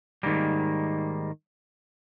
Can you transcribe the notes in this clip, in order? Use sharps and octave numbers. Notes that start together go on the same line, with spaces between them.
G#2 D#3 G3 A#3